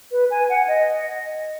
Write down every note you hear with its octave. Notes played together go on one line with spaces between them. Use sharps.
B4
G#5
F#5
D#5